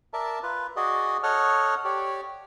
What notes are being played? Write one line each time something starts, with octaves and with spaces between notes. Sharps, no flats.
A#4 D5 E5 A5
F4 B4
F#4 G#4 D5 D#5
A4 C#5 D#5 F#5 F6
G4 C#5 D5